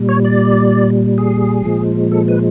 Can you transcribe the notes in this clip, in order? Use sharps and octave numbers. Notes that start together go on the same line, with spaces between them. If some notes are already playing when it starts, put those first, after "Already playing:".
Already playing: A#2 G3
C#5
D5
G#4
A#2 F3 G#3
A4
B4